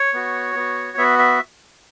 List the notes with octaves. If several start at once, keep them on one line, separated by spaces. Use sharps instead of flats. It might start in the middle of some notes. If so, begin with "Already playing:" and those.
Already playing: C#5
B3 F#4
B3 F#4
B3 F#4 E5
E5